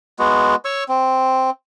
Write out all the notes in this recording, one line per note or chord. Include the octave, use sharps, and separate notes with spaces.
G#3 B3 F#4
C#5 C#6 E6
C4